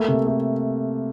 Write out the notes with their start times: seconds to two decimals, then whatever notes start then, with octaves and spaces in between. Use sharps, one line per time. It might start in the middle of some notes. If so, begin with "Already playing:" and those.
Already playing: A3 A#3
0.08 C3
0.27 A3